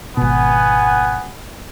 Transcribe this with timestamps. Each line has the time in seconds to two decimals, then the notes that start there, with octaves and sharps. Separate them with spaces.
0.17 G#1 B2 B3 F#5 G#5